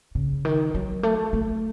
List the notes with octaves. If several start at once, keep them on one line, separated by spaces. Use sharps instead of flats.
C#3
D#3
F#3
A3
A3